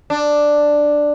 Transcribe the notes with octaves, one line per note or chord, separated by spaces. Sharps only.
D4